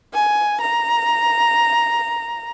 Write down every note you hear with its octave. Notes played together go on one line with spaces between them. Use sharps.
G#5
A#5